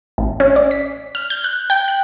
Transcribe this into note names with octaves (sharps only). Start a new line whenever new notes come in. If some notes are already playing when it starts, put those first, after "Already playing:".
A1
C#4
D5
B6
F6
G6
F#6
G5
F#6